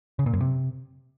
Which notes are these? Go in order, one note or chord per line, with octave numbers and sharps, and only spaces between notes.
C#3
A#2
F#2
C3